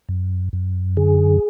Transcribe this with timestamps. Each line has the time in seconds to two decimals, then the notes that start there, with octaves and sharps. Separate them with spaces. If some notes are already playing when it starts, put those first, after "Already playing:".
0.09 F#2
0.53 F#2
0.97 D3 G#4